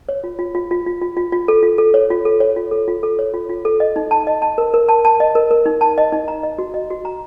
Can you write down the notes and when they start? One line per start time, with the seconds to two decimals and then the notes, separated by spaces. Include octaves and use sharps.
0.09 C#5
0.24 F4
0.39 F4
0.55 F4
0.71 F4
0.86 F4
1.01 F4
1.17 F4
1.32 F4
1.48 A4
1.63 F4
1.78 A4
1.94 C#5
2.10 F4
2.25 A4
2.40 C#5
2.56 F4
2.71 A4
2.88 F4
3.03 A4
3.19 C#5
3.34 F4
3.49 F4
3.65 A4
3.80 D#5
3.96 D#4
4.11 A5
4.27 D#5
4.42 A5
4.58 A#4
4.74 A#4
4.89 A5
5.05 A5
5.20 D#5
5.35 A#4
5.51 A#4
5.66 D#4
5.81 A5
5.98 D#5
6.12 D#4
6.28 A#5
6.43 D#5
6.59 F#4
6.74 D#5
6.90 F#4
7.05 A#5